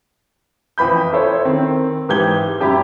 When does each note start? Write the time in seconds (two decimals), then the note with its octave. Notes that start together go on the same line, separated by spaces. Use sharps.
0.78 F2 E3 B5 G6
1.13 E4 A4 C5 C#5
1.45 D#3 C4
2.09 G#2 E3 G4 G6 G#6 G7
2.60 F#2 G4 E5 B5